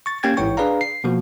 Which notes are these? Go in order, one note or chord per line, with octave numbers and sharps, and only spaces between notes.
C#6 A6
A#3 C#4 G4 G5 G#6 A6
A1 G#2 E4 C#5 G5 C#6
D4 G#4 B4 D5 F5 A#5
C7
B2 F3 A#3 F#4